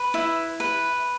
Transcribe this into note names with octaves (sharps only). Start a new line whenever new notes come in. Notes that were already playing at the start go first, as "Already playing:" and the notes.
Already playing: B4
E4
B4